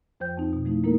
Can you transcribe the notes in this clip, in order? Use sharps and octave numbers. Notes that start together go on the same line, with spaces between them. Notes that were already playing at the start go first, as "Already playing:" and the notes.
F2 F3 C5 G5 G6
F2 C4 D#4
B2
F3 A3 D#4 E4
G#3 A#3 D#4 E4 A4 A#4